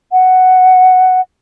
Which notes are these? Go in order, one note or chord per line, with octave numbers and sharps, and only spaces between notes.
F#5